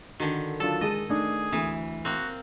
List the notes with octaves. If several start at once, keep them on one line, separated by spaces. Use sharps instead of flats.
D3 D#3 F#4
F#3 D4 F4 A4 A5
G#3 G#4 D#5 D#7
A3 D4 D#4 G#4
D2 E3
A#3 C4 F#4